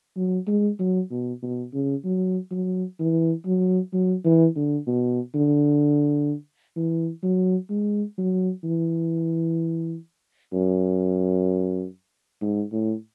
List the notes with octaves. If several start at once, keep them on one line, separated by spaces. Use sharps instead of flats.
F#3
G#3
F#3
B2
B2
C#3
F#3
F#3
E3
F#3
F#3
E3
D3
B2
D3
E3
F#3
G#3
F#3
E3
F#2
G#2
A2